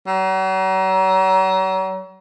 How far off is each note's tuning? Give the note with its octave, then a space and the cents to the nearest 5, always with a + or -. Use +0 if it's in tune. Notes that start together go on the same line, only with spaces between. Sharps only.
F#3 +40